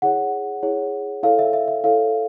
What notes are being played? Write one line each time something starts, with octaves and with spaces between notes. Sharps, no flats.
E4 G#4 C#5 F#5
E4 G#4 C#5
E4 A4 C#5 F5
E5
E5
E5
E4 A4 C#5 F5